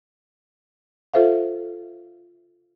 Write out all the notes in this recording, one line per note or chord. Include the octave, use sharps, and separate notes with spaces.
F4 A4 C5 E5 F5